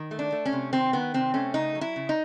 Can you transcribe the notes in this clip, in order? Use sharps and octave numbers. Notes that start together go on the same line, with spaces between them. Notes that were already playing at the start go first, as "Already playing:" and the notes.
Already playing: D#3
A3
D4
A3
C#4
C3
D#3 C4
D#3 B3
C3 C4
A3 C#4
C#3 D#4
F#3
E4
C#3
D#4